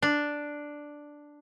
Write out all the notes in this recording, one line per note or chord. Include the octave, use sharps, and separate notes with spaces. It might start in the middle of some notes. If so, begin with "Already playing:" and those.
D4